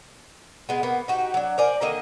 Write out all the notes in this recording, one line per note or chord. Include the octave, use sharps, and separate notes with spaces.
G#3 B3
A#3 B3
D#4 F#4 G4
F#3 D4
A#4 C5 D5 G#5
D3 D#3 A#3 D#5